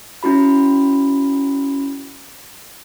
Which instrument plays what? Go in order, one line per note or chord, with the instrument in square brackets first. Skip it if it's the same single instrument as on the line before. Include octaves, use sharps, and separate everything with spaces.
[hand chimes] C#4 E4 F#4 B5